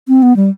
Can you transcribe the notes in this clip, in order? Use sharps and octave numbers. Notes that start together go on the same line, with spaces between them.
C4
B3
G3